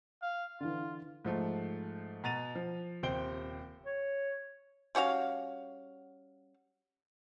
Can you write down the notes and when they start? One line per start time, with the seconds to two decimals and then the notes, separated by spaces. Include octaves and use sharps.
0.22 F5
0.61 D3 E3 F4
1.25 G#2 F3 A3
2.24 B2 A#5 A6 D#7 F7
2.55 F3
3.03 D#1 C3 C5 G5 D7 G7
3.86 C#5
4.95 G3 C#4 F#4 F5